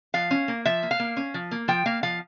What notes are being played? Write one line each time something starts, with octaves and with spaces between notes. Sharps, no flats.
F3 F5
C#4
A#3
F3 E5
A#3
F5
A#3
C#4
F3
A#3
F3 G5
A#3 F5
F3 F5